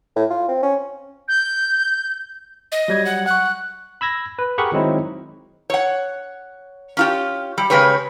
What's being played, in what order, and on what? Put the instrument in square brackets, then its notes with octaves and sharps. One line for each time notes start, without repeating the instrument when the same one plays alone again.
[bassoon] A2
F4
C4
C#4
[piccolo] G6
[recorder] D#5
[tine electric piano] F#3 G3 G#6
[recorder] F#5
[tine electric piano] F#5 C#6 [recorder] F#6
[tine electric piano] B5 E6 G#6 A#6
B4
G4 G#4 A#4 F#5 B5 C#6
D#3 F#3 G#3 C4 D#4 E4
[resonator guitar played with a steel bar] C#5 F#5
C#4 F4 G4
G3
C#3 G#3 G4 B4 C#5